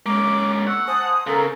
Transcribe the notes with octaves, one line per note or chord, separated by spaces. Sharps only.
G#3 A#3 C#4 D6
F#5 C#6 E6
C5 G#5 A5 D#6
C#3 A4 A#4 A#5